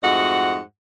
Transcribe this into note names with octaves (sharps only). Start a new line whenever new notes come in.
F2 G#2 A3 F#4 D#5 F#5